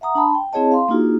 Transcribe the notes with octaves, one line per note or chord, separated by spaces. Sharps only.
E5 F#5 A#5 D#6
D4 A5 B5 C6
G5
C4 E4 G#4 C#5 D#5 A5
F5 C6
A#3 D4 D#4 F4 F#4 G#4